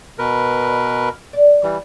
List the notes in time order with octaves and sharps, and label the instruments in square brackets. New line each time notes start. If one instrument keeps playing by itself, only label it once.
[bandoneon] B2 A#4 B4
[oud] D#5
D5
[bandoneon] E3 G3 [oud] G4